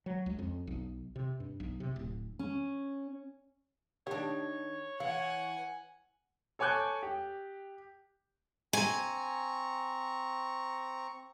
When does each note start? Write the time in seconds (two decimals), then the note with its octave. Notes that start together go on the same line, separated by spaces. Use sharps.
0.06 F#3
0.26 C#2
0.39 F2
0.67 B1
1.16 C3
1.40 G2
1.60 B1
1.80 C3
1.96 D1
2.39 C#4
4.07 D#3 D4 G4 C#5
5.00 E3 F5 F#5 G#5
6.59 A4 C#5 G#5 D6 F#6 G6
7.03 G4
8.73 C4 G#5 A#5 C#6